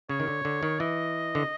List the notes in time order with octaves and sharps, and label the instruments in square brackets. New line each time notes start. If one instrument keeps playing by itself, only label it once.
[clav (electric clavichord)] C#3 [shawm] C#5
[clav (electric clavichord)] D#3
D3
D3
D#3
[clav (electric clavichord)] E3 [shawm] D#5
[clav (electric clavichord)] D3